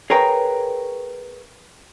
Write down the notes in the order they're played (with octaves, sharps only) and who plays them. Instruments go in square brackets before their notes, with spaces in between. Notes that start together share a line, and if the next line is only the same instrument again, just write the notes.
[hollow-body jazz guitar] G#4 A#4 B4 C#5 G5 A#5